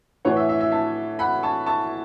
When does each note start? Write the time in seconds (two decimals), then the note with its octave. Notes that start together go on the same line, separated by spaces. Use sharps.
0.25 A2 E3 C#5 F#5
0.36 E5
0.49 E5
0.61 E5
0.72 E5 A5
1.19 F#5 B5
1.43 A5 C#6
1.66 A5 C#6